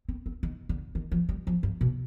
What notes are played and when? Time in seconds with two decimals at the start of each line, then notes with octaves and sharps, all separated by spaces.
0.09 C4
0.26 C4
0.43 D#3
0.69 D3
0.95 D#3
1.12 F3
1.29 G3
1.47 F3
1.63 G2
1.81 B2